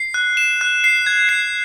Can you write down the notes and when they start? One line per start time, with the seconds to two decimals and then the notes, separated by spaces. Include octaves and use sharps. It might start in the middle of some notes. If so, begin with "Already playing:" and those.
Already playing: C7
0.14 F#6
0.37 E7
0.61 F#6
0.84 C7
1.06 G#6
1.29 C7